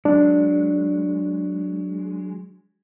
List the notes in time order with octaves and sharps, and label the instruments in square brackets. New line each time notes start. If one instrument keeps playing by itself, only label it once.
[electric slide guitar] F#3 G#3 [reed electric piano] D4